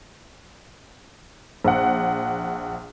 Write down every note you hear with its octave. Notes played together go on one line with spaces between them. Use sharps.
A#1 F#5